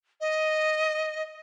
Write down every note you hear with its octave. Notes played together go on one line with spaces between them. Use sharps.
D#5